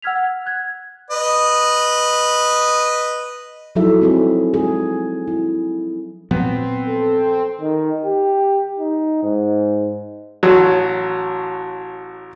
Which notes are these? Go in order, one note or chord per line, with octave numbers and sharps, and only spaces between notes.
F#5 E6 F6 G#6 B6 F7
F#6 G#6
B4 D#5
F3 F#3 D#4 E4 A4 E5
C4 G#4 A4
G#4
E4
A#2 F3 F#3 B3 C4
A4
D#3
G4
D#4
G#2
A1 F#3